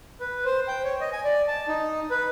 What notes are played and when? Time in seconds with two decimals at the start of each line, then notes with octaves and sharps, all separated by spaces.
0.20 B4
0.45 C5
0.68 G5
0.84 C#5
1.01 D#5
1.12 G#5
1.24 D5
1.48 A5
1.68 D#4
2.10 B4